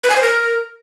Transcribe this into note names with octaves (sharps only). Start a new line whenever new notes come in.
B4
G#5
C5
A#4